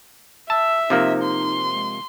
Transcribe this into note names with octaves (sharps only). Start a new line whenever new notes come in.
E5 A5 E6
C3 F3 A#3 D#4
C6
G#3